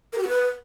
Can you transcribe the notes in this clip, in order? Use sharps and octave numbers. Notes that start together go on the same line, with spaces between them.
A#4
G4
F#4
B4